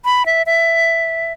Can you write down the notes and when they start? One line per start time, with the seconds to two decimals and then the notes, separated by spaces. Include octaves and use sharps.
0.05 B5
0.26 E5
0.46 E5